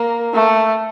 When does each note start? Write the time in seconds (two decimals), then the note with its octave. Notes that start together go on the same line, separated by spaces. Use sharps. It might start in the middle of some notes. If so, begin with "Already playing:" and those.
Already playing: A#3
0.34 A3